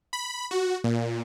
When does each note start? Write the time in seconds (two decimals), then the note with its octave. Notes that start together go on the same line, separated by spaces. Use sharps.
0.13 B5
0.51 F#4
0.84 A#2